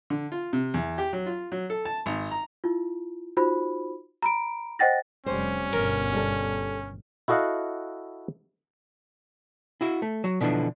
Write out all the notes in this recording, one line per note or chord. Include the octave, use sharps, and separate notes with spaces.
D3
F4
C3
E2
G4
F#3
F4
F#3
A4
A5
G#1
A#5
E4 F4
D#4 F4 F#4 C5 B5
A#5 B5 D7
C5 D#5 F#5 G5 A6 A#6
F1 G3 C#4 C5
G1 B2 A#4
G3 A4
E4 F#4 A4 D#5 F5 F#5
E4 F#4 E5
A3
F#3
B2 D3 E3 F3 D4